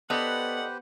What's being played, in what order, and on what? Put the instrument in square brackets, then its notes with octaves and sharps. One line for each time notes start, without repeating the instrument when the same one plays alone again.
[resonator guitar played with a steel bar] B3 [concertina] G4 B4 C5 [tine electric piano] A4 D5 D#5 [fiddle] F#5